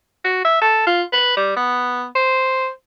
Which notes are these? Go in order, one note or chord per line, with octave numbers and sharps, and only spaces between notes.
F#4
E5
A4
F4
B4
G3
B3
C5